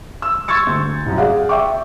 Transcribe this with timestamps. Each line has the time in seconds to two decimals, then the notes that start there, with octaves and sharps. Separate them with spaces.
0.22 E6
0.48 C6 C#6 E6 G#6 A6 C#7
0.67 D2 G6
1.06 C2 F#2
1.17 G#4 D5 F5 F#5
1.49 E5 G5 C#6 D6